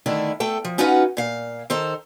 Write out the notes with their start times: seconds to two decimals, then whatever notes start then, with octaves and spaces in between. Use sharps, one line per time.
0.06 D3 D#3 A3 D4 E4
0.40 A3 A4 G5
0.65 F3
0.78 C#4 D#4 F4 F#4 B4 F#5
1.17 A#2 F5
1.70 D#3 A4 C5 A#5